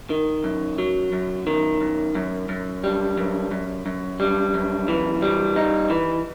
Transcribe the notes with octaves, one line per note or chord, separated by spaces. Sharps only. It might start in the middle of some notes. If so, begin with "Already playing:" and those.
D#3
F#2
F#3
F#2
D#3
F#2
F#2
F#2
G3
F#2
F#2
F#2
G3
F#2
E3
G3
D#4
E3